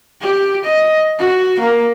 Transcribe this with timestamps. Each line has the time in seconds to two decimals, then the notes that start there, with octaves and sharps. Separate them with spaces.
0.21 G4
0.64 D#5
1.18 F#4
1.60 A#3